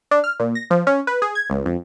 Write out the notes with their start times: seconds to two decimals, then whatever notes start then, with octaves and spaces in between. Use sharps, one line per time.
0.11 D4
0.24 F6
0.40 A#2
0.55 A#6
0.71 F3
0.87 C#4
1.07 B4
1.22 G#4
1.35 G#6
1.50 C#2
1.66 F2